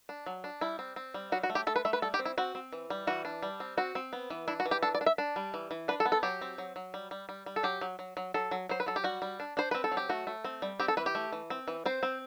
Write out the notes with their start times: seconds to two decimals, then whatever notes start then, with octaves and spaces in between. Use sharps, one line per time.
0.09 D4
0.26 F#3
0.44 D4
0.61 G3 E4
0.79 C4
0.96 C4
1.14 G3
1.32 F#3 F#4
1.43 F#4
1.50 A3
1.55 G4
1.67 A3 A4
1.76 B4
1.85 A3 E5
1.93 B4
2.02 G3 A4
2.14 G4
2.19 C4
2.25 E4
2.38 C4 F#4
2.55 C4
2.73 E3
2.90 G3
3.07 E3 F#4
3.25 D4
3.42 G3
3.60 C4
3.77 C4 F#4
3.95 C4
4.13 B3
4.30 E3
4.48 D4 E4
4.60 F#4
4.66 E3
4.71 G4
4.82 D4 A4
4.95 D5
5.01 D4
5.06 E5
5.18 D4
5.36 G3
5.54 E3
5.71 E3
5.88 D4 B4
6.00 A4
6.05 B3
6.12 A4
6.23 F#3 G4
6.41 C4
6.58 F#3
6.76 F#3
6.94 G3
7.11 G3
7.29 G3
7.46 G3
7.56 A4
7.63 F#3 G4
7.81 F#3
7.99 F#3
8.17 F#3
8.34 F#3 A4
8.51 F#3
8.69 F#3 C5
8.80 B4
8.86 F#3 A4
8.96 G4
9.04 G3 F#4
9.22 G3
9.40 D4
9.57 D4 C5
9.71 C4 B4
9.84 A4
9.92 F#3
9.97 G4
10.09 A3 F#4
10.27 A3
10.44 C4
10.62 G3
10.80 C4 G4
10.88 A4
10.97 E3 B4
11.06 G4
11.15 A3
11.32 E3
11.50 C4
11.68 E3
11.86 C4 C5
12.03 C4